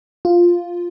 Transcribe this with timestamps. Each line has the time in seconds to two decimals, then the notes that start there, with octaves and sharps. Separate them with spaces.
0.25 F4